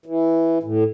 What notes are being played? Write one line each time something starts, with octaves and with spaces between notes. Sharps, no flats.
E3
A2